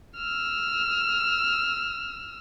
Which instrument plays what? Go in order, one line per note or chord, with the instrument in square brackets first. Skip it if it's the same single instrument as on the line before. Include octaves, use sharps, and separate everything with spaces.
[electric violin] E6 F6